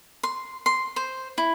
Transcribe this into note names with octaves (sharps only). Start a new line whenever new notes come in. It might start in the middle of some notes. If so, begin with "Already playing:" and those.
C6
C6
C5
E4